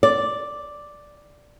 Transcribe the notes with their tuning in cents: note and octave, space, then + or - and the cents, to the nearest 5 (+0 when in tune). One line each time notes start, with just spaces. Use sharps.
D5 +0